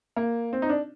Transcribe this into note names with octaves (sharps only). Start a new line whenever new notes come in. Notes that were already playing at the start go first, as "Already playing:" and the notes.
A#3
C4
D#4
D4